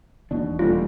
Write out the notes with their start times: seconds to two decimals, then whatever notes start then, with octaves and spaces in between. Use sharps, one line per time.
0.31 E1 D#2 B2 D4
0.59 D2 B2 G3 F4